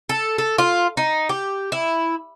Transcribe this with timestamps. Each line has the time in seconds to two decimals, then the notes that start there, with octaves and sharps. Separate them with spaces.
0.09 A4
0.38 A4
0.58 F4
0.97 D#4
1.29 G4
1.72 E4